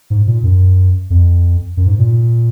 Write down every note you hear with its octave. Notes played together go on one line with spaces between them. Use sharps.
G#2
A#2
F#2
F2
F#2
G#2
A#2